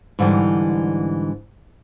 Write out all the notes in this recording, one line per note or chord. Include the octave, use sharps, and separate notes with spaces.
G#2 D3 E3 G3